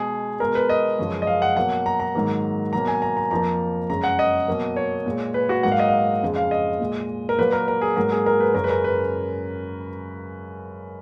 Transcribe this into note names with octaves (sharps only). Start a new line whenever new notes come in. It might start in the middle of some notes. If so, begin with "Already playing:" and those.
Already playing: B2 G#3 G#4
B2 G#3 A#4
B4
D#5
F#2 C#3 F3 G#3
D#5
F5
F#5
B2 F#3 A#3 F#5
A#5
A#5
G#2 D#3 F#3 A#3
B2 F#3 A#3 A#5
G#5
A#5
A#5
F2 F3 A#3 A#5
F#2 C#3 G#3 A#5
F#5
D#5
B2 F#3 A#3
C#5
A#2 G#3
B4
F#4
G#2 F#3 A#3 F#5
F5
D#5
F5
F2 C#3 G#3
F5
D#5
A#2 G#3
A#4
A#2 F#3 A#3 B4
A#4
A#4
G#4
G#2 F#3 A#3 A#4
G#4
A#4
B4
F#2 C#3 G#3 A#4
B4
A#4
B4